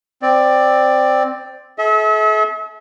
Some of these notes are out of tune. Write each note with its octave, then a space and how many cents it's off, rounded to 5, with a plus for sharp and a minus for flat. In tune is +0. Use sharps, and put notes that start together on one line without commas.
C4 +0 D5 +10
A4 -45 E5 -35